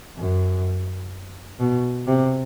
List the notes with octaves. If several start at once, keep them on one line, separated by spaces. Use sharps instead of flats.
F#2
B2
C3